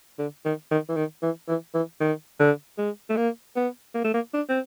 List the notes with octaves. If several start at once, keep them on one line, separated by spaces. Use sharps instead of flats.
D3
D#3
D#3
E3
D#3
E3
E3
E3
D#3
D3
G#3
A3
A#3
B3
A#3
A3
A#3
D4
C4